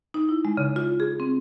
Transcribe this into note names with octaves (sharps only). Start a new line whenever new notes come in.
D#4
E4
G#3
C#3
F4
G#4
C4